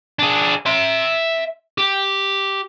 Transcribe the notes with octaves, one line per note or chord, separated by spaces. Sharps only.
D4 G#4
E5 C6
G4